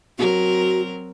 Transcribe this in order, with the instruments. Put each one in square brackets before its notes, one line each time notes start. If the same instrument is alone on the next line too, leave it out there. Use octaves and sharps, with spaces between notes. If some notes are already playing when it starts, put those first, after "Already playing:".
[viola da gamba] F#3 C4 A#4 [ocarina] F#4